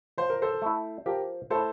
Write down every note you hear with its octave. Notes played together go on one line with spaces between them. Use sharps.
F3 C5
A#4
A4 C5
A3 E4
F3 G4 A#4
A3 E4 A4 C5